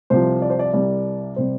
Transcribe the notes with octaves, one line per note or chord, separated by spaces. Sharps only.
C2 C3 F3 C5
D5
C5
D5
C2 C3 G3 D5
C3 G3 C5